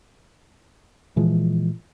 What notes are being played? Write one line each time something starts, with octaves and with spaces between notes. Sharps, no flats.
A#2 E3 F3 G#3